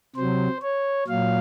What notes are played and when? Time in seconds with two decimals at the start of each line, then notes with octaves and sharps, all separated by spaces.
0.16 C3 F#3 C5
0.62 C#5
1.07 A#2 F#3 F5